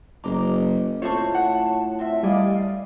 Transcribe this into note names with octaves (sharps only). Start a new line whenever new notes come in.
F#1 D#5 A#5 D6
A2 A3 C4 F4 C5 C#5 A5 C#6
F#5
C4 E5
G3 D5 D#5 F5 G#5